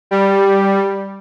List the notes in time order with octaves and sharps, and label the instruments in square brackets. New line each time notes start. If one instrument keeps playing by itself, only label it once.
[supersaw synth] G3